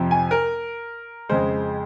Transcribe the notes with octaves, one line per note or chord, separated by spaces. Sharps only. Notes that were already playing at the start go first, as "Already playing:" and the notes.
Already playing: F2 C3 F3
G#5
A#4
F2 C#3 G#3 C5